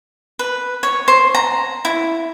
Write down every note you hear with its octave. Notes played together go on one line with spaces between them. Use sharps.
B4
C#5
C5
A#5
E4